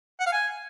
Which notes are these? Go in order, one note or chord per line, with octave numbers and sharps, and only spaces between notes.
F#5
F5
G#5